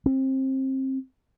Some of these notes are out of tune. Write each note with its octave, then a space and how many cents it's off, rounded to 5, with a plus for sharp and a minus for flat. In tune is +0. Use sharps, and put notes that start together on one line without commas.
C4 +25